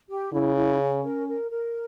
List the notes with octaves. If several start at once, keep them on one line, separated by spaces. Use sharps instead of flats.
G4
C#3 E4
E4
C#4
A#4
A#4
A#4